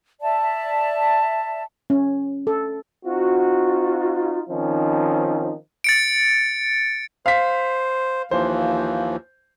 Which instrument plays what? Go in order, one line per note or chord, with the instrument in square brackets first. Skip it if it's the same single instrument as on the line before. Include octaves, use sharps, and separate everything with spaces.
[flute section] D5 E5 A5
[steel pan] C#4
A4
[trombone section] C4 D#4 F4 F#4
D#3 F3 C4 C#4 D#4
[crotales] A6 C#7 D7
[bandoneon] C5 [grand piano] F5 B6
[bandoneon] D#2 E3 F3 [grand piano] C5